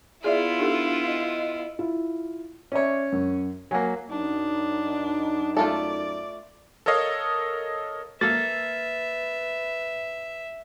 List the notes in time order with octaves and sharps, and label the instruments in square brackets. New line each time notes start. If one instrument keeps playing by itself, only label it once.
[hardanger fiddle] B3 E4 [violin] F4 [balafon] G#4 D5 E5
[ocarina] D4 [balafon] D#4 G4 A4
[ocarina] D#5
[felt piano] E4 F4
[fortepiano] C#4 C#5 [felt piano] D5 E5 C#6
[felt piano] F#2
[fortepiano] F#3 A#3 [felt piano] G#5
[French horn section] F#2 D#4 [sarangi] D4
[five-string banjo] A3 F4 A4 [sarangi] D5
[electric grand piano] A4 A#4 C#5 D#5 F5
[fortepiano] A#3 A4 [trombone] B4 [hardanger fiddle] E5 [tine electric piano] A6